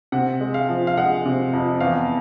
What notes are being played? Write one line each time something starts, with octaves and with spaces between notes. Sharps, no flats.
C3 F#5
G#3
F5
F3
F5
G#3 F#5
C3
F2
E2 F5